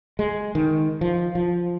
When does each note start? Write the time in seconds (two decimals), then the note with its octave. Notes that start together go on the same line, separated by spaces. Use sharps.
0.19 G#3
0.55 D#3
1.01 F3
1.35 F3